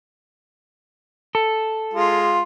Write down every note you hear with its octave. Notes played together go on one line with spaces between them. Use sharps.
A4
G#3 F4